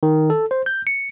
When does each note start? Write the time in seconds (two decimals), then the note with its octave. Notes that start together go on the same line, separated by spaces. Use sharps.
0.03 D#3
0.30 A4
0.51 C5
0.66 G6
0.87 C#7